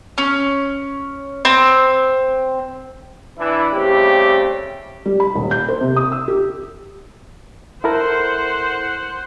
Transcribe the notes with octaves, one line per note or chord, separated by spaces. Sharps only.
C#4
C4
E3 D4 E4
C#3 G3 A3 C4 G4
G3
B5
D#1
G6
C5
C3
D#6
E6
G4
E4 A4 A#4 C5 F#5